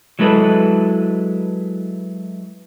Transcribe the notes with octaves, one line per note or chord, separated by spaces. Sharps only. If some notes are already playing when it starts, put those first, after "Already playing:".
F#3 G#3 E4 A4 B4